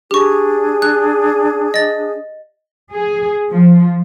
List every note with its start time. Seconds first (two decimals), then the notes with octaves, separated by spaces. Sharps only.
0.11 D4 G4 G#4 C#6
0.82 F#6
1.74 D#5 A6
2.93 G#4
3.52 F3